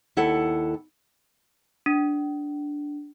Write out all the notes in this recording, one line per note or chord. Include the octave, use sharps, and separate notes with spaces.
D#2 E4 A4 F#5
D4